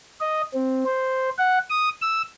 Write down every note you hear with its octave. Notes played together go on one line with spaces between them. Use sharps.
D#5
C4
C5
F#5
D#6
E6